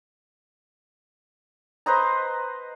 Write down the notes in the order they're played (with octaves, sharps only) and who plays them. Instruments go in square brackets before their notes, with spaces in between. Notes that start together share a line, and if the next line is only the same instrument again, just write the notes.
[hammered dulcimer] B4 C5 D#5 A#5